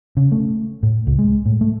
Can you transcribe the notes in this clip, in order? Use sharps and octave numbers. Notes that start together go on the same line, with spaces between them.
C#3
A3
A2
C#2
G#3
A2
A3